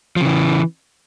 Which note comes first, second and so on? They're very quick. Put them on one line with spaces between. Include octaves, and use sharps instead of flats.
F3 C#3 E3